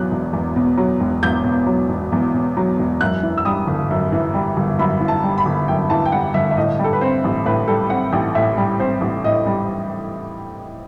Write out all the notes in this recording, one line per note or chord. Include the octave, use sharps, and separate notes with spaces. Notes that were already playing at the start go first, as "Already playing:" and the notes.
Already playing: E2 B2 F#3 F#6
E1
E2
B2
F#3
E1
E2 G6
B2
F#3
E1
E2
B2
F#3
E1
F#2 F#6
E3
E6
G3 D#6
G1
F#2
E3
G3
G1
F#2 B5
E3
A5
G3
B5
G1
F#2 G5
E3 A5
G5
G3 F#5
G1 E5
E5
A2 D#5
G3
A4
B4
C4 C5
A1
A2 B4
G3 A4
C4 F#5
A1 G5
A2 E5
G3
C4 C5
A1
A2 D#5
G3